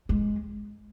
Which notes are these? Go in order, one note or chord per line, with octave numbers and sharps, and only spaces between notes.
G#3